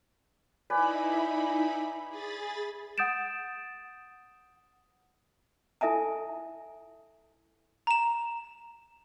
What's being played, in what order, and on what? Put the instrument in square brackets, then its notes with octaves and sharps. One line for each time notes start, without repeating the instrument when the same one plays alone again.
[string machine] D#4 E4 B5 [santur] B4 D5 G#5
[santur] E5
[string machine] G#4 B5 A6
[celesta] F#5 D#6 G6 A6 D7 E7
[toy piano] E4 A4 E5 G#5 A5
[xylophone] A#5 E7